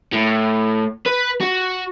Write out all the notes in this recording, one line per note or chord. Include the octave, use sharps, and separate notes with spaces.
A2
B4
F#4